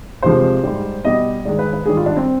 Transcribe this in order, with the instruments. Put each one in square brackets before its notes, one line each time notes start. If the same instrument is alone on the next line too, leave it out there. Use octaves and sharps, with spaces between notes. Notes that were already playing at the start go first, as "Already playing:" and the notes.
[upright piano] F2 C3 F3 G#3 C5
G#2 G3
B2 G3 D#5
G#2 D#3 G#3 D5
B4
B4
G#2 D#3 G3 G#4
F4
D4
C4